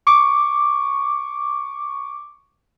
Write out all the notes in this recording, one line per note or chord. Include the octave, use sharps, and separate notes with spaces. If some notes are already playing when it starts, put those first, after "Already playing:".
C#6 D6